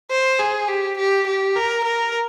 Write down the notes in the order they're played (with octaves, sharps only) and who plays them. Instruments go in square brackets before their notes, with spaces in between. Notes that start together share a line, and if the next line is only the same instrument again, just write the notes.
[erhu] C5
G#4
G4
G4
G4
A#4
A#4